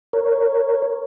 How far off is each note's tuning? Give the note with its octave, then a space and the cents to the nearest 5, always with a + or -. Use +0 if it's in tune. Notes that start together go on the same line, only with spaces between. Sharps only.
A#4 -10 C#5 +0